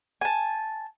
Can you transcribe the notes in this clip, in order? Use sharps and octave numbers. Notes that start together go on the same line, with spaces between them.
G#5 A5